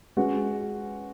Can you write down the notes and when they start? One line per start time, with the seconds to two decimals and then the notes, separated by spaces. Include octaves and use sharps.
0.17 G#3 C#4 F#4 B4